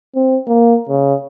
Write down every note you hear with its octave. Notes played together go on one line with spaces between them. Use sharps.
C4
A#3
C#3